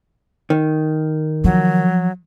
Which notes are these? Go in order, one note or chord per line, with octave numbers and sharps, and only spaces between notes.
D#3
F3 F#3